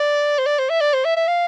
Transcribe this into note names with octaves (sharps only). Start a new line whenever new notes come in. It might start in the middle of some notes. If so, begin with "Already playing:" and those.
Already playing: D5
C5
D5
C5
E5
D5
C5
E5
E5
F5